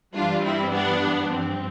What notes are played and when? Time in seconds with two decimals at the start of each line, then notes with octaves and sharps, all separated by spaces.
0.14 G2 E3 G3 D4 F4
0.43 C4 E4
0.72 B3 D4
1.30 G2 F3 C4